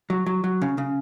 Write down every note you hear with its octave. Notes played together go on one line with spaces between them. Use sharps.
F#3
F#3
F#3
C#3
C#3